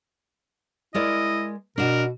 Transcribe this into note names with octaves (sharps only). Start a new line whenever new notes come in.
G#3 E4 A#4 D5 D#5
B2 D4 F#4 A#4